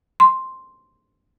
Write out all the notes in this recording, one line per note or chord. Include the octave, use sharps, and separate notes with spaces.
C6